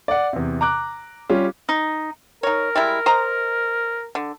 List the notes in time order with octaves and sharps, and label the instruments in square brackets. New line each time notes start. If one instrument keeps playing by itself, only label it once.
[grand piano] D5 F#5
E2 C3
A#5 D6 F#6
G3 C#4 F4
[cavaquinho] D#4
[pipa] D#4 C#5 [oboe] A#4
[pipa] G3 G#3 E4
C5 D#5 A#5
D3